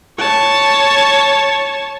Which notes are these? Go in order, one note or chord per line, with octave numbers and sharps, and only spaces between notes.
C#5 A5